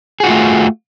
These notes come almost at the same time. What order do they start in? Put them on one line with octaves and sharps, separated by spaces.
G#4 F#4 F4 A3